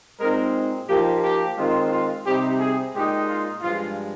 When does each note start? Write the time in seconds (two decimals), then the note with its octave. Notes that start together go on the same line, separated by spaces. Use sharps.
0.19 A#2 G#3 C4 D#4 A#4
0.88 F3 A#3 D#4 G4
1.22 G4
1.56 D#3 G#3 C4 F4
1.90 F4
2.25 C3 G3 C4 D#4 G4
2.59 G#4
2.93 A#2 G#3 D#4 G4
3.27 F4
3.61 G2 F3 G#3 F4